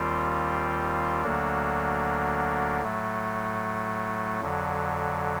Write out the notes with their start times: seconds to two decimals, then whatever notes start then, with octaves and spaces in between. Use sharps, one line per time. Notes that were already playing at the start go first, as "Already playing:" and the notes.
Already playing: D#2 D#3 G3 C4 F4
1.22 D2 D3 F#3 A#3 D4
2.81 A2 F#3 A3
4.41 F2 D3 F#3